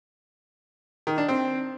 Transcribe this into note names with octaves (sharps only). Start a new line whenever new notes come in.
D#3
D4
C4